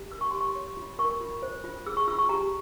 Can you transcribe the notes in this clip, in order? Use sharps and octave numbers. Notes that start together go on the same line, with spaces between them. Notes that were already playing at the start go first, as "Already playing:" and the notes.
Already playing: G4
A#4 E6
C#6
G4 C6
C#6
C#5
F4
A#4 C#6
F4
C5
F4
G#4 E6
C#6
F4 E6
C#6
G4 A#5